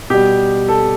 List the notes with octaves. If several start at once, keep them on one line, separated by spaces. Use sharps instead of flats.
B2 G3 G4
A4